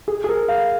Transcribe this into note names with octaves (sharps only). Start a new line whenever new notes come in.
G#4
G#4
A#4
F5